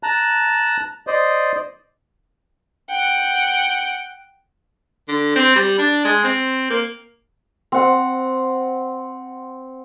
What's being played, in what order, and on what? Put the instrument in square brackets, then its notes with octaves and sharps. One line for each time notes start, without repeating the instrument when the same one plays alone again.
[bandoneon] A5 A#5 F#6
C5 D5 D#5
[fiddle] F#5 G5
[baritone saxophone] D3
C4
G3
D4
G#3
C4
A#3
[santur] C4 F#5